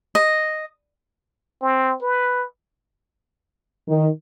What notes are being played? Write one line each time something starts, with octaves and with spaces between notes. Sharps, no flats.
D#5
C4
B4
D#3